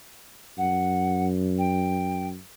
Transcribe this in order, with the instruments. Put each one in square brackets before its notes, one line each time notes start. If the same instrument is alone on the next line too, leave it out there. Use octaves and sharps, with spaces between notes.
[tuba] F#2 [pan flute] F#5
[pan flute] G5